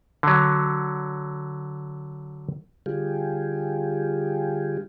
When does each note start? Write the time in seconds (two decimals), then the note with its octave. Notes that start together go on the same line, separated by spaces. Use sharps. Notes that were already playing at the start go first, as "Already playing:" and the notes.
0.23 D3 F#3
2.86 D3 G3 F4 G4 G#4